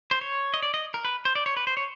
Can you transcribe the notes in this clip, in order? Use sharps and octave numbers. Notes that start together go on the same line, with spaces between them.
C5
C#5
D#5
D5
D#5
A#4
B4
C5
D5
C#5
B4
C5
C#5